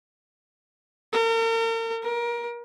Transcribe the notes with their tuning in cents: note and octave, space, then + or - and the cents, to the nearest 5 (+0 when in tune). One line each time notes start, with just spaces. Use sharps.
A#4 -40
A#4 +25